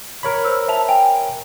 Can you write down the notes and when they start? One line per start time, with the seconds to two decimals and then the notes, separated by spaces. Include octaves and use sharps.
0.23 A#4 C#5 B5
0.45 C5 E6
0.68 E5 A5 F7
0.89 G5 G#5